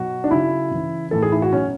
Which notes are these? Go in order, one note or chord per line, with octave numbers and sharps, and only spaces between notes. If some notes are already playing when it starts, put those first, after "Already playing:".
Already playing: B2 F#3 F#4
D4
C#3 F#3 E4
C#3 E3
A2 E3 A4
G#4
E4
F#4
B2 F#3 C#4